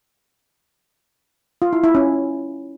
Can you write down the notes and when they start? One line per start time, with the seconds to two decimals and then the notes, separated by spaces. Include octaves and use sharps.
1.62 F4
1.73 E4
1.84 E4
1.95 C#4